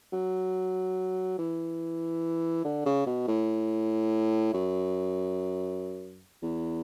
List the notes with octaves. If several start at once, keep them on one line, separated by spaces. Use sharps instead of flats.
F#3
E3
D3
C#3
B2
A2
F#2
E2